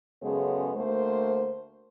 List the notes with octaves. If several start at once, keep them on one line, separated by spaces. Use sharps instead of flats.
F#2 C#3 G#3 B3 A4 C5
D2 A3 A#3 C5